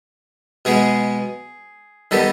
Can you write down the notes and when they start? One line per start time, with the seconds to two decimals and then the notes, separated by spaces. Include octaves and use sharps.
0.65 B2 G#3 B3 G#4
2.11 D#3 G3 B3 A4